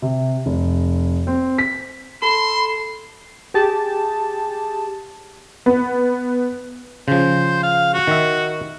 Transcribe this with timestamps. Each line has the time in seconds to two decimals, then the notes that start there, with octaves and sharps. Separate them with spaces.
0.02 C3
0.46 F1
1.27 C4
1.58 B6
2.22 A4 B5 C6
3.54 G4 G#4 A5
5.66 B3
7.08 C#3 F3 C5
7.63 F5
7.94 F#4
8.07 D#3 E5